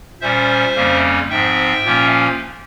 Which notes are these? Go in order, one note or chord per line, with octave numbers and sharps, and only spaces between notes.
A#2 G3 C#4 C5 E5
F2 C#3 G3 A#3 C#4
G#2 F3 C4 E5 G5
A#2 F3 A#3 C#4